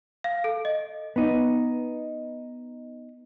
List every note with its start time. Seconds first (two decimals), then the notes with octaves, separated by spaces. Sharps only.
0.24 F5
0.44 A4
0.65 D#5
1.16 B3 D#4